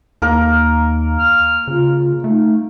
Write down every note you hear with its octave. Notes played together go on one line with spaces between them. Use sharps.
D#2 A#3 A#4
F6
C#3 F4
A3 D#4